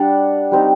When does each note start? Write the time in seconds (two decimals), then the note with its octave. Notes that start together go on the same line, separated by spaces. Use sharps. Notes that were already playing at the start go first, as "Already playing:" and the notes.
Already playing: G3 D4 F#5
0.52 G3 C4 D#4